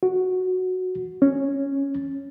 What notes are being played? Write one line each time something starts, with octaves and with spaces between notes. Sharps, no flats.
F#4
C#4